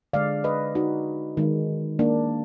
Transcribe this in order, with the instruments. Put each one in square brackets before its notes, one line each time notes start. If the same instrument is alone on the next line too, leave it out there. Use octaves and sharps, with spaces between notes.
[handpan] D3 G#3 D5 F5
B4 D#5
D#4 F#4
D#3 G#3
A#3 D4